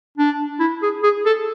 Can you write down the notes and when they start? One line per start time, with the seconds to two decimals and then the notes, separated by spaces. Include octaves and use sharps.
0.18 D4
0.60 E4
0.82 G#4
1.03 G#4
1.26 A4